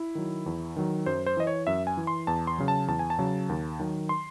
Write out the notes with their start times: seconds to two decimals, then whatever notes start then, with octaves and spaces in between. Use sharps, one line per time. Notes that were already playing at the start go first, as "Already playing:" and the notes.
Already playing: E4
0.15 D#3 F#3
0.46 E2
0.76 D#3 F#3
1.06 F#2 C5
1.26 C5
1.37 E3 D#5
1.47 C#5
1.67 F#2 E5
1.87 G#5
1.97 E3
2.07 C6
2.27 E2 A5
2.47 C6
2.58 C#3 F#3
2.68 A5
2.88 E2 A5
2.99 G#5
3.10 A5
3.19 C#3 F#3
3.49 D#2
3.80 D#3 F#3
4.09 C6